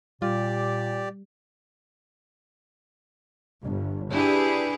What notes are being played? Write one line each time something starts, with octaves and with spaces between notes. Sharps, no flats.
A#2 G3 F4 G4 D5
G1
D4 E4 G4 G#4 B4